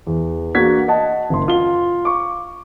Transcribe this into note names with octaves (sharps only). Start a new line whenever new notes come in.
E2
A#3 D4 F#4 G#4 G#6 B6
D#5 F#5 A5
F#1 C6
F4 G7
C#6 D6